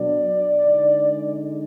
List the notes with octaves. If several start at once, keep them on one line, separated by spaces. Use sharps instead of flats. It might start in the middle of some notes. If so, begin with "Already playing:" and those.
Already playing: B2 F#3 D4 D5
D3 G#3 D#4